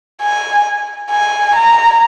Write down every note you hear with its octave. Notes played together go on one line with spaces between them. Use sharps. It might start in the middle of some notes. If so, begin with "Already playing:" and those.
G#5
G#5
A#5